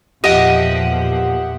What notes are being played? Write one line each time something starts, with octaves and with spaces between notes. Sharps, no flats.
E2 A#2 F3 G4 D#5 E5 F#5